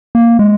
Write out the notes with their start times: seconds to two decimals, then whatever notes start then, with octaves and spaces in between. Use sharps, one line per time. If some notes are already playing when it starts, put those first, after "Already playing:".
0.15 A#3
0.39 G#3